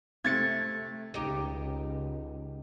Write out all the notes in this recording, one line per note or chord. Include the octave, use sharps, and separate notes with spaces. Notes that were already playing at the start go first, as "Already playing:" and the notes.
C3 A3 G#6 A6 C#7
C#2 D#4 G4